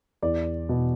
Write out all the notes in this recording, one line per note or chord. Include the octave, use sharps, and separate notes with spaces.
E2 D5
B2